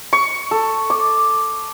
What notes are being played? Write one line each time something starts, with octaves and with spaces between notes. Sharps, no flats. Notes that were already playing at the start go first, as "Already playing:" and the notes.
C#6
A4
D6